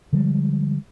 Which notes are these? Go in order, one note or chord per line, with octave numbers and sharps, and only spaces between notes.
D3 F3 G3 G#3